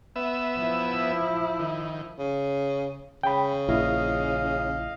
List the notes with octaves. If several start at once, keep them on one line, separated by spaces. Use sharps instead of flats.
B3 E5
F3 E4
D#3
C#3
C#3 G5 B5
A#1 E4 D#5 F5